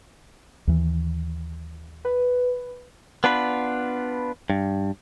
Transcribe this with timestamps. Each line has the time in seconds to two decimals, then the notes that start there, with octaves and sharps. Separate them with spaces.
0.67 D#2 E3
2.05 B4
3.24 B3 D4 F4 B4
4.50 G2